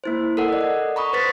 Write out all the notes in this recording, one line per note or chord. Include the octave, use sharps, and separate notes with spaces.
A#3 E4 C5
A4 A#4 F#5
D5 D#5
F#5
A#5 B5 C#6 D#6
B4 C5 A6 B6